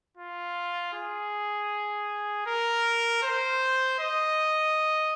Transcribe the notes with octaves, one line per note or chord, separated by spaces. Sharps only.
F4
G#4
A#4
C5
D#5